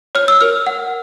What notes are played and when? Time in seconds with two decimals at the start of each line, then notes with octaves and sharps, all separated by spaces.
0.15 C#5 F6
0.28 E6
0.41 A#4 F6
0.67 F#5